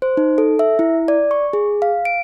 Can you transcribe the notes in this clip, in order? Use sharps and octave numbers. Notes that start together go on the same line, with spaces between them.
C5
D#4
A4
E5
E4
D5
C#6
G#4
F5
D7